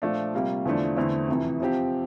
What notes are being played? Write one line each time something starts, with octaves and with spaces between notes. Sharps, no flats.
A#2 F3 A3 D4
C3 G3 A#3 F4
E2 D3 F3 A3 D4
E2 D3 A3 C4 E4
F2 C3 E3
C3 F3 C4 G4